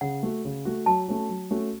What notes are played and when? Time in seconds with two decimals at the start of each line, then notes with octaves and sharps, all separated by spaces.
0.01 C#3 F#5
0.23 A3 F#4
0.45 C#3
0.65 A3 F#4
0.86 F#3 A5
1.08 A3 C#4 F#4
1.29 F#3
1.51 A3 C#4 F#4